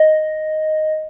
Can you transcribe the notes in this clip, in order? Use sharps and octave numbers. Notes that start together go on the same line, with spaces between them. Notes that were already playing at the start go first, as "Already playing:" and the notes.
Already playing: D#5